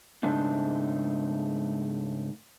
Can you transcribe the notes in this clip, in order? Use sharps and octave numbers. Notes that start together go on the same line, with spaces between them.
G#2 C#3 G#3 A3 D4 D#4